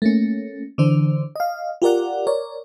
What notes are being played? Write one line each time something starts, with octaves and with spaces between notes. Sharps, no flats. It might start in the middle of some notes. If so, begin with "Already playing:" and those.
A3 A#3 C#4
D3 E3 D4 C5
D#5 F5
F4 G4 A#4 D5 F#5
A#4 C#5 D5